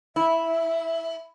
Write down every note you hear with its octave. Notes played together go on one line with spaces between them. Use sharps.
E4 E5